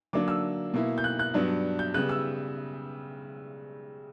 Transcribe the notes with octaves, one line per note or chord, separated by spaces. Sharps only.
D3 F#3 A#3 D4 D6
E6
B2 A#3 E4
G6
F#6
F#6
G2 F#3 B3 D4
G6
C#3 G3 B3 F#6
E6